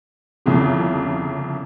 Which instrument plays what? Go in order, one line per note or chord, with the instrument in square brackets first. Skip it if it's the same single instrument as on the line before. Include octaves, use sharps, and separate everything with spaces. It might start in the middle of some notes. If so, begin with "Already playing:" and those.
[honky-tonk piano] G1 C2 F2 C#3